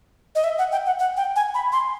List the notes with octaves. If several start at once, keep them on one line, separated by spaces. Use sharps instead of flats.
D#5
E5
F#5
G5
F#5
F#5
G5
G#5
B5
C6